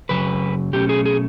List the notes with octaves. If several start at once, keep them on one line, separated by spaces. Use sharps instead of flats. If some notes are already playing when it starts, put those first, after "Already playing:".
F#2 C#3 F#3 B4
B2 F#3 A3 C#4 G4
G#4
G#4